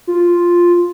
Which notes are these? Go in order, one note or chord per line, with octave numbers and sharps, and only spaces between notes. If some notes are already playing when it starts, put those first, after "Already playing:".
F4